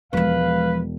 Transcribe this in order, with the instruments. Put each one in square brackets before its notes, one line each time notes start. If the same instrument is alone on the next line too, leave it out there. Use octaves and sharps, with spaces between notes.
[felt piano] E1 [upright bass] F3 G#3 [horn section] B4 F5